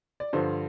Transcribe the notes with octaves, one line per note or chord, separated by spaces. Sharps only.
D5
G2 D3 F3 C5